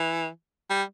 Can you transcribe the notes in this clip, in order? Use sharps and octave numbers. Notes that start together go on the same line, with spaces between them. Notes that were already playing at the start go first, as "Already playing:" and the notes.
Already playing: E3
G3